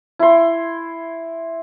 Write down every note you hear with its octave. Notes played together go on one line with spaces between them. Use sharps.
E4 C6